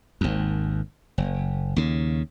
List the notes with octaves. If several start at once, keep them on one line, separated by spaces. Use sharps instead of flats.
G#1 D#2
F#1
D#2 C#3